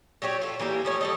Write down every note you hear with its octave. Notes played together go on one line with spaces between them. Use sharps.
F#3 D4 G4 C#5
F4 A4
E3 G3 A#3 G4
F3 A3 C#5
G3 A4 D#5